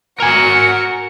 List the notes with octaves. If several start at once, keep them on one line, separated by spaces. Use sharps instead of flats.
F#4 A#4 G#5 C#7